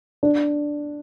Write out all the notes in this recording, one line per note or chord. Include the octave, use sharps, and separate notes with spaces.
D4